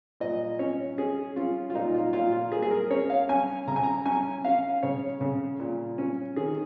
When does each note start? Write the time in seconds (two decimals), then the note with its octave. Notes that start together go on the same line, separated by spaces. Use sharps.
0.20 A#2 D#5
0.59 C#4 C#5
0.98 C#4 G#4
1.36 C#4 F4
1.70 F4
1.75 A#2 D#4
1.94 F4
2.13 A#2 F4
2.32 F4
2.52 A#3 G#4
2.63 G#4
2.71 A#4
2.90 C#4 C#5
3.10 F5
3.29 C#4 G#5
3.67 C#3 A#5
3.76 G#5
3.84 A#5
4.06 C#4 G#5
4.44 C#4 F5
4.83 C#3 C#5
5.21 C#3
5.60 A#2
5.98 C#4
6.36 D#3 G#4